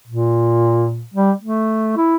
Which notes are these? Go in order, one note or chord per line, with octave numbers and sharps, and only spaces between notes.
A#2
G3
A3
E4